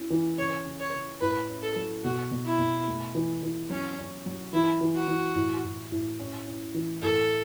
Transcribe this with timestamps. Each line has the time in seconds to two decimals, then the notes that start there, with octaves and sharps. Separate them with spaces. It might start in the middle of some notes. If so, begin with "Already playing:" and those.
Already playing: C#4 E4
0.10 E3
0.38 C#3 C#5
0.66 C#3
0.80 C#5
0.94 C#3
1.21 A2 B4
1.49 C#4
1.63 A4
1.76 F#3
2.04 B2 F#4
2.31 B2
2.45 E4
2.59 B2
2.88 A3
3.15 E3
3.43 E3
3.70 F#3 C#4
3.98 C#4
4.26 F#3
4.53 E3 E4
4.81 E3
4.95 F#4
5.08 E3
5.35 A2
5.64 A2
5.92 A2
6.20 C#4
6.47 C#4
6.75 E3
7.02 A2 A4